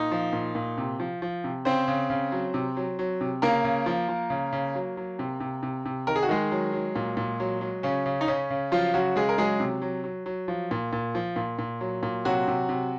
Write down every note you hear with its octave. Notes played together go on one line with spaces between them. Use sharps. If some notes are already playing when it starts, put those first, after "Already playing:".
Already playing: A#2 D#4
F3
A#2
A#2
C3
F3
F3
C3
C#3 C4 C5
C#3
C#3
F#3
C3
F#3
F#3
C3
C#3 A#3 A#4
C#3
F3
F3
C#3
C#3
F#3
F#3
C3
C3
C3
C3
D#3 A#4
G#4
F#4
D#3 G#3 G#4
F#3
F#3
A#2
A#2
F#3
F#3
C#3 C#4
C#3
D#4
C#3 C#4
C#3
F3 F#3 F4
C#3 F#3 F#4
C#3 G#3 G#4
A#4
F#3 G#3 G#4
C3
F#3
F#3
F#3
F3
A#2
A#2
F3
A#2
A#2
F#3
A#2
C3 F#3 F#4
C3
C3